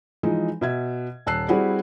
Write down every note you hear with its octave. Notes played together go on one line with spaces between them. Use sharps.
E3 F3 G#3 D#4
B2 E5 G#6
D#1 A5 E6 F#6 C7
G3 C4 E4 F#4 G#4 D5